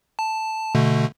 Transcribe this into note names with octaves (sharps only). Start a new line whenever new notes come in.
A5
B2 D3 A3